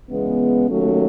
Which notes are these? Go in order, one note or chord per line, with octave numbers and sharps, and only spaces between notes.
E2 C#3 G#3 B3
D#2 D#3 F#3 A3 C#4